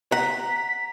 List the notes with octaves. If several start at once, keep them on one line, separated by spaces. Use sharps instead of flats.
F#5 A#5 B6